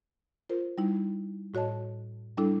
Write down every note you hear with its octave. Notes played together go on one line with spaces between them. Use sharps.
F4 A#4 C5
G3 D#4 E4
A2 F#4 C#5 D#5 A5
G3 D4 E4 A4